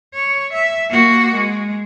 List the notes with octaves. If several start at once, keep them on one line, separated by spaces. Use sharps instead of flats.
C#5
E5
A#3 F#4
G#3